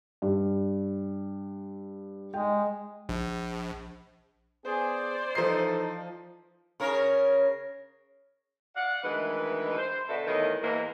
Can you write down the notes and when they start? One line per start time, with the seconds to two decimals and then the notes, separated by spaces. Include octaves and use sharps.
0.22 G2
2.34 G#3 G5
3.09 A#1
4.64 B3 G#4 C5 D5
5.35 E3 F3 D#4 A4 C7
6.80 C#3 A#4 C#5
8.76 D5 F5 F#5
9.04 D2 D#3 E3 G#3 B4
9.78 C5
10.09 B2 D3 A4 E5
10.27 E2 A2 D#3 D#5
10.62 E2 G#2 E3 A#3